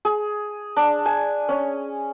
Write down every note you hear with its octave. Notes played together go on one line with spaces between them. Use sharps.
G#4
D4
G#5
C#4